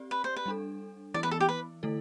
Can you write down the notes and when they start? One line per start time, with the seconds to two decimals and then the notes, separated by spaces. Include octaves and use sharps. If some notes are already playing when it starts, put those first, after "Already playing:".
Already playing: C4 G4 D5
0.11 B4
0.24 C5
0.36 B4
0.46 G3 D4 A4
1.14 E3 B3 E4 D5
1.23 B4
1.31 A4
1.40 G4
1.49 B4
1.83 D3 A3 E4 A4